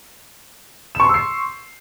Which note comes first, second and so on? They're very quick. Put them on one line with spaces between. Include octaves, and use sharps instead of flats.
E7 C#6 C6 E6 C7